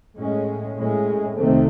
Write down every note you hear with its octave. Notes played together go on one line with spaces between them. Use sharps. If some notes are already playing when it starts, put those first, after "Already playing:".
A2 G#3 C#4
A2 G#3 C#4
C2 C3 D#3 A3 C4